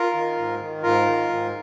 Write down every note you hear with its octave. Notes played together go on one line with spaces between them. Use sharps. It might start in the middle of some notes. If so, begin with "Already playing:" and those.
Already playing: F4 A#4
D#3
G#2
D#3
G#2 F4 A#4
D#3
G#2